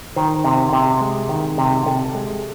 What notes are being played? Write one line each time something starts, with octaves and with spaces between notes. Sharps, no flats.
D#3 C5
C3
C3
G#3
D#3
C3
C3 A4
G#3